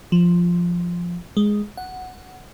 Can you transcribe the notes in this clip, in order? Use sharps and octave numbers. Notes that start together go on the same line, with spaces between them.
F3
G#3
F#5